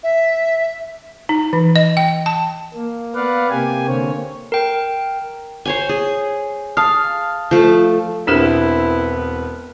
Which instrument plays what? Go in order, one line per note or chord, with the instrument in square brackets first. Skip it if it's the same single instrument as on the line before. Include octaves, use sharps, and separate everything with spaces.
[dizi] E5
[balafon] D#4
E3
D#5
G5
A5
[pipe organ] A#3
B3 B4 D5 F5 F#5
C3 A#3 G4 G#5
D3 A#3 C4 C#5
[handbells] A#4 G5
[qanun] C5 C#5 G#5
G#4
[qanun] F5 [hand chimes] A5 D#6 F6
[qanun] F3 A3
[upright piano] E1 C4 F6 [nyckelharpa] B3 [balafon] D4 G4 A#4 [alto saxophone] E4